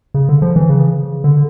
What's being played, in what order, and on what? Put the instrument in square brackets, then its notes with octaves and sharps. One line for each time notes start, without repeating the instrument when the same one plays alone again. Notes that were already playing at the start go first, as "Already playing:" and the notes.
[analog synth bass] C#3
D3
F3
E3
C#3
D3